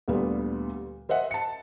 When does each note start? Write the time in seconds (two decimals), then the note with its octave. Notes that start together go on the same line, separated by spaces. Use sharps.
0.08 D2 A#2 G3 B3
1.09 A#4 C5 D#5 E5 F#5
1.31 A5 C#7